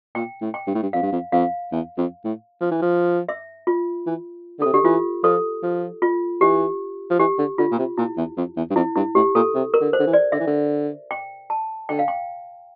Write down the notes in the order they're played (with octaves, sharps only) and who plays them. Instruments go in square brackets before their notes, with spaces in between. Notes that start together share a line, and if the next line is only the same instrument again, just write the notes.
[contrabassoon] A#2 [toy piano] G5
[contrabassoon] A2
[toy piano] G5
[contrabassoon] G2
A2
G2
[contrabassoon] F2 [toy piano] F5
[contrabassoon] G2
F2
[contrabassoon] F2 [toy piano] F5
[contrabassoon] E2
F2
A2
F3
E3
F3
[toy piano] E5
F4
[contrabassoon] E3
D3
[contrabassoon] C3 [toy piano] A4
[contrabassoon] D3 [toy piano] G4
[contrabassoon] E3 [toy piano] F4
[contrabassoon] F3 [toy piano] A4
[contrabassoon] F3
[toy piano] F4
[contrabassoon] E3 [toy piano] G4
[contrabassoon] F3
[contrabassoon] E3 [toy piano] G4
[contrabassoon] D3
[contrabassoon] D3 [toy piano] F4
[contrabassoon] A#2
C3
[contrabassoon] A#2 [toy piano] E4
[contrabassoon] E2
F2
E2
G2
[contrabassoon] F2 [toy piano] E4
[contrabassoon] G2 [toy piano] E4
[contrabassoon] A2 [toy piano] G4
[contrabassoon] A#2 [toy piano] A4
[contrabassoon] C3
[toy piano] A#4
[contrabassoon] D3
[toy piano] C5
[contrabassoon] D3
E3
[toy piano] D5
[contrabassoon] D3 [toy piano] E5
[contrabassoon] E3
D3
[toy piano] G5
A5
[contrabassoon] D3 [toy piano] G5
[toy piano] F5
G5